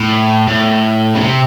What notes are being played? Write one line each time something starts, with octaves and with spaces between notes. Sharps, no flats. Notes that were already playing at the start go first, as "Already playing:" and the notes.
Already playing: A2
A2
C#3
C3